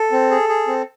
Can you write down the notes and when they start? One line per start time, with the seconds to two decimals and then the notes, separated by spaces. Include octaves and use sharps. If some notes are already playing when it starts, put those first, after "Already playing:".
Already playing: A4
0.12 C4
0.31 G#4
0.49 G#4
0.68 C4